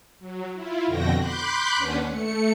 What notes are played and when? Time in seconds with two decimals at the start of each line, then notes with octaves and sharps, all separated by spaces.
0.19 F#3
0.53 E4 F4
0.86 F2 B2 D3 F#4 G5 A#6
1.17 B5 C6 D6 F#6 G6 B6
1.76 D#2 C#4 D4 B4 F#5
2.07 A3 C#7